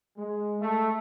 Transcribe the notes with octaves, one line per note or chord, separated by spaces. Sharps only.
G#3
A3